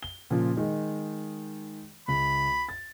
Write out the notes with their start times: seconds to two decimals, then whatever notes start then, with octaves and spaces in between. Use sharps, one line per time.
0.03 G7
0.30 A#2 C#3 F3
0.57 D#3 G#3 D#4
2.08 C#2 B5
2.69 A6